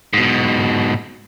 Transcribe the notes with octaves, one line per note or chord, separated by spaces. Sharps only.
G#2 B2